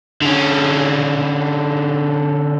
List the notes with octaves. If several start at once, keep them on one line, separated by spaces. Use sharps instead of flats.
D3 C#4